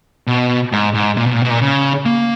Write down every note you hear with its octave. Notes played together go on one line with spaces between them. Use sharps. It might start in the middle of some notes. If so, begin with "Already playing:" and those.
B2
G#2
G#2
A#2
B2
A#2
B2
A#2
C#3
A#3